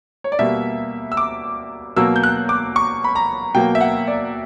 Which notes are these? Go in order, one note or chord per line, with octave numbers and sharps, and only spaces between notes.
C#5
D5
B2 G3 A#3 E5
E6
D6
B2 F#3 A#3 E6
G6
F#6
D6
C#6
B5
A#5
B2 F#3 A#3 G5
E5
F#5
D5